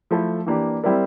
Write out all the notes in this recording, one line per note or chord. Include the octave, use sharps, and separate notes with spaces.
F3 A3 E4 A4
E3 A#3 D4 G4
G3 C4 E4 A#4 D5